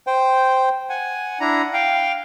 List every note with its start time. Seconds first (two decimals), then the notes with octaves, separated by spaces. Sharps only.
0.07 C5 G5
0.89 F#5 G#5
1.41 D4 E4 A#5
1.73 F5 G5